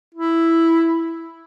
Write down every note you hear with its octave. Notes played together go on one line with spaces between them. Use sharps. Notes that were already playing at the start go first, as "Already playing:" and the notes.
E4